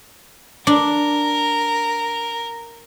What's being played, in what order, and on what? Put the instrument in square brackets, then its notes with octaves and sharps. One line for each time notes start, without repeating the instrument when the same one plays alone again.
[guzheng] D4 [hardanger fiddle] A#4